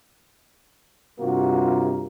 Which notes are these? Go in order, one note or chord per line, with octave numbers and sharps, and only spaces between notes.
G2 C3 A#3 F4 F#4